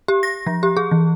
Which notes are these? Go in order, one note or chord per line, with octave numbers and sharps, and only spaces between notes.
G4
A#6
F3
G4
G#4
E3